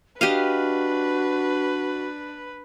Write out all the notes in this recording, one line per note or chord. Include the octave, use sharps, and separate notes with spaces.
D4 F#4 G4 B4 D#5 F5